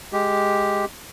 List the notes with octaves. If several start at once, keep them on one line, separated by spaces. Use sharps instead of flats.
G#3 G4